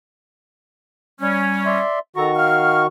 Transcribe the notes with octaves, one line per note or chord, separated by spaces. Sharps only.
G3 C#4
D5 E5 C6
D#3 F#4 A4 A#5 C#6
F5 F6